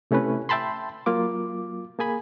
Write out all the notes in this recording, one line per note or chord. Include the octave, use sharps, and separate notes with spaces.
C3 A3 C#4 E4 B4
E5 G5 A5 B5 C6
F#3 A#3 F4 D6
A#3 G#4 G#5 B5